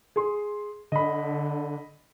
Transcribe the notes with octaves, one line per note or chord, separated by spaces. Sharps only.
G#4 C6
D3 D#5 B5